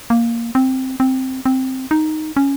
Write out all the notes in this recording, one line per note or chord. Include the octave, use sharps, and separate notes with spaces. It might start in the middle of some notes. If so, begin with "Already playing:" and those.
A#3
C4
C4
C4
D#4
C#4